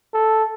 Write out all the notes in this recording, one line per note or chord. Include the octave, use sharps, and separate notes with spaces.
A4